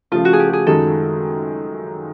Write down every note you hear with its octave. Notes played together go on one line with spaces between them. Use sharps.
C#3 F3 A3 F4
F#4
G#4
G4
G#4
F#2 D#3 G#3 A4